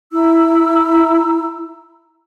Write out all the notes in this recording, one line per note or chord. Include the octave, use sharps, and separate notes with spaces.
E4 A#5 E6